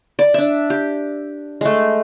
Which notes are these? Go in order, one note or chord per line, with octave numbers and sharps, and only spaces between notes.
D5
D4 E5
G4
G#3 A3